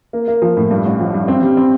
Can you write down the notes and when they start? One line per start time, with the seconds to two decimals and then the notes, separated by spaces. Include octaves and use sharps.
0.13 A#3
0.28 A#3
0.42 F3
0.57 A2
0.71 G2
0.85 A1
1.00 F3
1.14 G2
1.28 C4
1.42 G3
1.57 C4